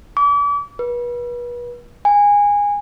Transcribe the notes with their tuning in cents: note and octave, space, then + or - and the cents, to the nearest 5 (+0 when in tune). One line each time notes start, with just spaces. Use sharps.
D6 -40
B4 -35
G#5 -20